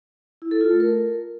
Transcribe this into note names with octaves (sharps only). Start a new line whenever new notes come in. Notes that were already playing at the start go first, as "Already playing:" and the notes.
E4
A4
F4
A3
A#4